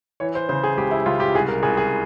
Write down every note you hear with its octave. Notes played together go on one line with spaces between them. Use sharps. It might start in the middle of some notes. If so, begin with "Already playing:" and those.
E3 C#5
C5
C#3 C5
G#4
C#2 G4
E4
C#2 F4
G4
C2 G#4
A#4
C2 G#4
G#4